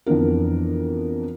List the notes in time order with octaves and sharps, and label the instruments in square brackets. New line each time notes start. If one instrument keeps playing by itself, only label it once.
[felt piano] F2 E3 B3 D4 A#4